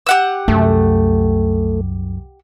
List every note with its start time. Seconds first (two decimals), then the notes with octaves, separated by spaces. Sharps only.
0.07 G4 F#5 E6
0.48 C2 F#2 A3